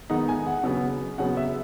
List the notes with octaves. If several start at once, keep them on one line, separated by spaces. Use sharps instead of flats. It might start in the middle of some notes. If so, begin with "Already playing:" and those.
D#3 G#3 B3 D#4 F#5
G#5
F#5
C#3 F#3 B3
C#3 F#3 B3 F#5
E5